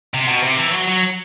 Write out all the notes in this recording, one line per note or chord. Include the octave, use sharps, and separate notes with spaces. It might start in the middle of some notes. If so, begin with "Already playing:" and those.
C3
B2
C3
E3
F#3
F#3